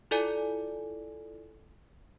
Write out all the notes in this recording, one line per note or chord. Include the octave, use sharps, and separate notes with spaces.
E4 F4 A4 D5 G#5